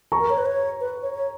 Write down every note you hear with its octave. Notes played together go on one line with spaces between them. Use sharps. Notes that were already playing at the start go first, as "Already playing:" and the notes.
A#5 C#6
A#4
C#5
B4
C#5
B4
C#5
C#5